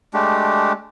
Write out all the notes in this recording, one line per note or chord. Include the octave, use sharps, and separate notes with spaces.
G#3 A3 D4 G4